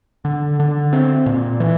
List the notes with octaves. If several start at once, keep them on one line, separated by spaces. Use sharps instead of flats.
D3
D3
C4
A#2
E3